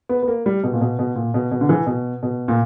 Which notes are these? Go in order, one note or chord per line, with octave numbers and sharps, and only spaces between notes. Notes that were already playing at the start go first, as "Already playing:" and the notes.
B3
B3
A#3
G3
B2
A#2
B2
B2
A#2
B2
B2
D3
E3
B2
B2
A#2